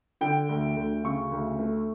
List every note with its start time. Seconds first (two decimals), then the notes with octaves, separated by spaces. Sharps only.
0.21 D3 G5
0.49 D2
0.77 D2
1.04 C#3 C#6
1.32 D2
1.59 A3